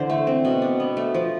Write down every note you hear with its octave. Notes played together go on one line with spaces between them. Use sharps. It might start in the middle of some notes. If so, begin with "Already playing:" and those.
Already playing: D3 E3 C5
A3
C4
B2
D4
B3
A3
F3